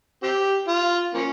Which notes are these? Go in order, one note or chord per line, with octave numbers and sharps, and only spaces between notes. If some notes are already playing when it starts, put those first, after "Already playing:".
C4 G4
F4
F3 A#3 C#4